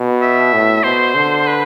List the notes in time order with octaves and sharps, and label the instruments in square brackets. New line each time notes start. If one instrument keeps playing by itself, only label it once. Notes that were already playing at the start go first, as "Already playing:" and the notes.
Already playing: [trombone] B2
[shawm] E5
[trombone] A2
[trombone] B2 [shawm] C5
[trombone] D3
[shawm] B4